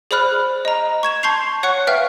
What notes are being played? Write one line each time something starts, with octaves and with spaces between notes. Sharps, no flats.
G#4 C5 D5 B5 F6 F#6
D#5 A#5
C#6 G#6 E7
A5 C6 C#6 G6 C7 F7
C#5 F#5 C#6 F#6 C#7
B4 E5 F5 G5 F6